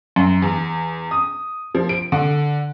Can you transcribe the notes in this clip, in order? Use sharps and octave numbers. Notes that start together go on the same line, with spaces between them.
F#2
E2
D#6
F3
D7
D3